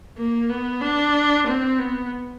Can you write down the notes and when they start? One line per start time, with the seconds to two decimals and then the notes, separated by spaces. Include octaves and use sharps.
0.17 A#3
0.49 B3
0.82 D4
1.47 C4
1.79 B3